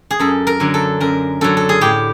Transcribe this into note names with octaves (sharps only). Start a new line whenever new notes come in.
G#4
F#2 A4
A#4
D3 F#3
A4
F#2 A#4
D3 F#3 A4
A4
G#4
A2 G4